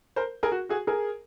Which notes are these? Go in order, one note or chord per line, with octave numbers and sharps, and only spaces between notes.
A#4 C5
G#4 A#4
F#4
F#4 G#4
G#4 A#4